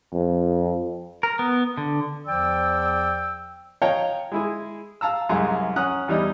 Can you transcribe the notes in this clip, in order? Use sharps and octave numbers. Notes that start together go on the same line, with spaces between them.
F2
A#4
B3
D3
E2 F3 D5 G5 E6
C#5 D#5 F5 G5 A5 A#5
G#3 E4 G#4
F5 A5 A#5 E6
C2 F#2 G#3 A#5 C6
C#4 F#5 A#5 D#6 F#6
E2 G3 D#4 E4 D#6